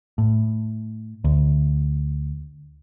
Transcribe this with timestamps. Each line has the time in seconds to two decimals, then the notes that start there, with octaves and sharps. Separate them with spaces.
0.18 A2
1.24 D2